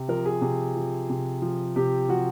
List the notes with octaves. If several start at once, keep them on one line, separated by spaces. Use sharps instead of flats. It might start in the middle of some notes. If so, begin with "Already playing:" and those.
Already playing: C3
F3 A#4
G#4
C3
F3
C3
F3
C3 G4
F3 F#4